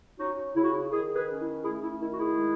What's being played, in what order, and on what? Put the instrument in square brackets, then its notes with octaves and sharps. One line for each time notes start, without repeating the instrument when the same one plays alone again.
[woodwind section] C#4 D#4 F#4
C#3 E4
F#4
E4
D#3 E4 G#4
G#4 B4
C#4
E4
A3 E4 G#4
E4
D#3 E4
F#4
E4 G#4
G#3